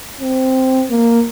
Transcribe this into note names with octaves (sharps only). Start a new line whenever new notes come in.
C4
A#3